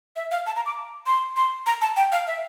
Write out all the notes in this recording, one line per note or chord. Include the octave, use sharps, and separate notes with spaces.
E5
F5
A5
A#5
D6
C6
C6
A#5
A5
G5
F5
E5